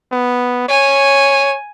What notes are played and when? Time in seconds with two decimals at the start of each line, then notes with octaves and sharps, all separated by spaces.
0.12 B3
0.69 C#5 G#5